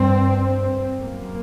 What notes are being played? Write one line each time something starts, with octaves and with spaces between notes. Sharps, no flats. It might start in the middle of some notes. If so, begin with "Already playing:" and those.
Already playing: G2 C4
F#2 A#3